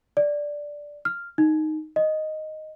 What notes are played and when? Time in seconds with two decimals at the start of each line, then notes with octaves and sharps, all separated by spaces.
0.17 D5
1.05 F6
1.38 D#4
1.96 D#5